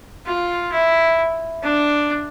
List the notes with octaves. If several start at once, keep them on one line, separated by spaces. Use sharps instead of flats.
F4
E4
D4